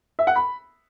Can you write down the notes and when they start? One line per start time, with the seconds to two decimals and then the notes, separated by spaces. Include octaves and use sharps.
0.19 E5
0.27 F#5
0.36 B5